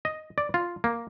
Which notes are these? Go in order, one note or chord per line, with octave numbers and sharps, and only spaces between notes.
D#5
D5
F4
A#3